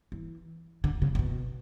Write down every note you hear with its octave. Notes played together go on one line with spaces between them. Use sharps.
E3
D3
C#3
C#3
B2